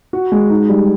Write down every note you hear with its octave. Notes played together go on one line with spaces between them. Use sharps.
F#4
G#3
D#4
G3